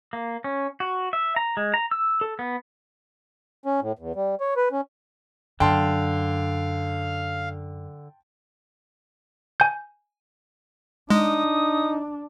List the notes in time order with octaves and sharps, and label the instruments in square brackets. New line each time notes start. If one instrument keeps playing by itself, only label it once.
[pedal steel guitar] A#3
C#4
F#4
E5
A#5
G#3
A#5
E6
A4
B3
[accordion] C#4
A2
E2
G3
C#5
B4
C#4
[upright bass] F#2 [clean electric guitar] D3 [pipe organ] F5 [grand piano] G5 A5 C6
[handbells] G#5 G6
[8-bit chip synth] G#3 [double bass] D4 [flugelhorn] D#4 [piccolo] D#6